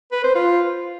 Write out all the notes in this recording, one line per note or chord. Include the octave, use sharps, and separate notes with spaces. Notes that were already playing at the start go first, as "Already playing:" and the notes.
B4
C5
F4